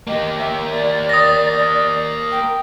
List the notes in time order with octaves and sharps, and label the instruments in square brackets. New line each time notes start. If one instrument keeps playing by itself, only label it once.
[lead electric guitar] A#3 G4 [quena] D#5
[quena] E5
D5
[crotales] D#6 A#6
[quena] G5